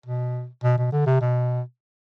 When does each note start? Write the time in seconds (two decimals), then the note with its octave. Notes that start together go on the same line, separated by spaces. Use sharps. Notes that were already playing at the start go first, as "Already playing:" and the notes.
0.06 B2
0.63 B2
0.78 B2
0.92 D3
1.06 C3
1.21 B2